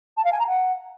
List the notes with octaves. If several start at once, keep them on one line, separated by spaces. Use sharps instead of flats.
A5
F5
G#5
A#5
F#5